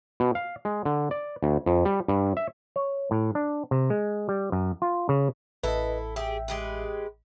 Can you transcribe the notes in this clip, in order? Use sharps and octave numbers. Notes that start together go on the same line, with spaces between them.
B2
F5
G#3
D3
D5
D2
F2
G3
G2
E5
C#5
A2
D4
C3
G#3
G3
F#2
F4
C#3
A1 E4 A4 B4 D#5
G4 G#4 E5 G5
G#3 G4 B4